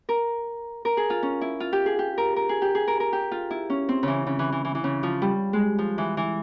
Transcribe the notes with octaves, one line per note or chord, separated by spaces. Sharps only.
A#4
A#4
G#4
F4
C#4
E4
F4
G4
G#4
G4
A#4
A#4
G#4
G4
G#4
A#4
A#4
G4
F4
E4
C#4
C4
C#3 E3
C#3
E3
E3
E3
E3
C#3
F3
G3
G#3
F3
E3
E3